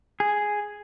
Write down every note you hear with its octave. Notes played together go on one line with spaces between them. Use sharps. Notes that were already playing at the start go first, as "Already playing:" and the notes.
G#4